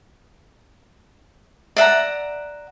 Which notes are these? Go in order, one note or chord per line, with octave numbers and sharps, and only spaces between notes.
D5 E5 F#5 A#5